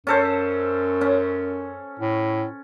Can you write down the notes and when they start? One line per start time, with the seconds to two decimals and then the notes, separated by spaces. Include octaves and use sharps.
0.07 F#2 C#4 A4 C5
1.01 C#4
2.00 A2